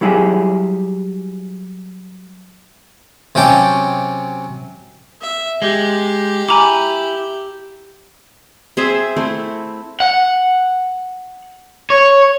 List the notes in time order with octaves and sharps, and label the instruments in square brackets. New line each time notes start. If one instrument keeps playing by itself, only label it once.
[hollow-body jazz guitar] F#3 G3 E4 G4 G#4
[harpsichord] C3 F#3 C#4 G5 A5 D6
[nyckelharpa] E5
[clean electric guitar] G#3 [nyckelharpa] G4
[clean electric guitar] E4 [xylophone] G#5 A#5 D6
[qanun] C4 G#4 C5 E5
A3 C4 E4
[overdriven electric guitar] F#5
C#5